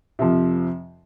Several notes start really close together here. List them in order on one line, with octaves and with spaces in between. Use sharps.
C3 F3 F2